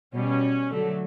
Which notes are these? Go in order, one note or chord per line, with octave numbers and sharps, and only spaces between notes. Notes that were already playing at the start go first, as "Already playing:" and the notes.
B2 G3 C#4
D3 F#3 A3